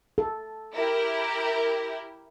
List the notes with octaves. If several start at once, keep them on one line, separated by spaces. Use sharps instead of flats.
A4
E4 G4 A#4